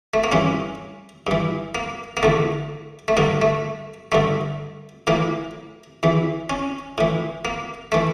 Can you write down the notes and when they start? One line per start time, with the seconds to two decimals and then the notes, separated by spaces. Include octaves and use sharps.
0.14 A3
0.24 A#3
0.32 G2 E3 C#4
1.27 G2 E3
1.75 A#3
2.17 A#3
2.23 E2 D3 A3
3.08 A3
3.17 G2 D3 A#3
3.42 A3
4.12 G2 D3 A3
5.07 A2 E3 A#3
6.03 E2 E3
6.50 C#4
6.98 A2 E3
7.45 A#3
7.92 E3 A3